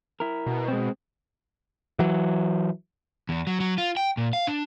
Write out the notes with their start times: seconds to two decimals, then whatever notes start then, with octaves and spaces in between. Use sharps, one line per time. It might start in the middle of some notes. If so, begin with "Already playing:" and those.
0.20 E4 A#4
0.47 B2
0.68 G#3 C4
1.99 E3 F#3
3.29 E2
3.47 F#3
3.60 F#3
3.78 F4
3.97 G5
4.17 A#2
4.33 F5
4.47 D4